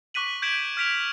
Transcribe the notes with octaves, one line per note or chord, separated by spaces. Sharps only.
C#6 D6 F#6 B6 D#7 F#7
G6 G#6 B6 D7 E7 F#7
F6 G#6 B6 D7 F7